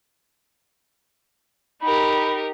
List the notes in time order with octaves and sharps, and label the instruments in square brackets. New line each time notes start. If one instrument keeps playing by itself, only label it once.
[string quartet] D#4 G4 A#4 [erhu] B5